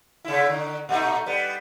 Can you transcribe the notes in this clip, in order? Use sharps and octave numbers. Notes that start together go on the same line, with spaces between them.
C#3 E4
D3
A#2 A3 D#4
G3 B3